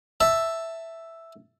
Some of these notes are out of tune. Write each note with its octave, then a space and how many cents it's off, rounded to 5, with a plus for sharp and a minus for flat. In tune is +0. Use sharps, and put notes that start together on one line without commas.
E5 +0 A5 +10